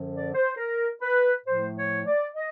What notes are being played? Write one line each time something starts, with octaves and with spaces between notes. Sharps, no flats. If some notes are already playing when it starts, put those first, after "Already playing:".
Already playing: F#2 D3 F3
D5
C5
A#4
B4
A2 F3 A3 C5
C#5
D5
D#5